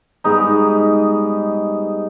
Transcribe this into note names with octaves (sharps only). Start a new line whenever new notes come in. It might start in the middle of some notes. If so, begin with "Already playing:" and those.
G#2 G3 B3 D#4